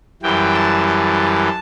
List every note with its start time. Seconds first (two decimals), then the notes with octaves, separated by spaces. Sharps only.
0.22 F#2 E3 G3 G5
0.54 A5
0.86 A5